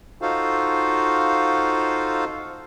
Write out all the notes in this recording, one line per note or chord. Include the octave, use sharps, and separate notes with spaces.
D#4 F4 F#4 A4 C5 F5